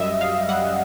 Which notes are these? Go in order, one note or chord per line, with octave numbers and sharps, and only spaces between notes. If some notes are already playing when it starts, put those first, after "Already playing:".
Already playing: F#2 G3 D#5 E5
F#2 F5
G3 F#5